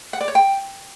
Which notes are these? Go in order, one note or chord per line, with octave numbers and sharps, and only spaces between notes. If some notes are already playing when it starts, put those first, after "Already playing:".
F#5
D5
C#5
G5